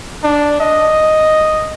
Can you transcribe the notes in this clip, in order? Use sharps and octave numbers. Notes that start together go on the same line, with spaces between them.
D4
D#5